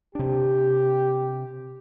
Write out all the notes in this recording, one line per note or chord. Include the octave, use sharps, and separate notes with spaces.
C3 D4 G4